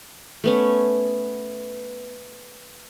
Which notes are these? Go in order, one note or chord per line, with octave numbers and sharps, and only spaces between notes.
A3 B3 C#4